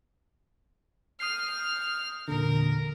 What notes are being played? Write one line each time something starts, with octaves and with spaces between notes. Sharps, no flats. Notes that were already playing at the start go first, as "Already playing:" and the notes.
D#6 F6 G6 C7
E2 A#2 D3 A#4